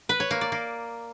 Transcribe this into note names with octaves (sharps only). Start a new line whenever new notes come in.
B4
C#5
A#3
D5
A#3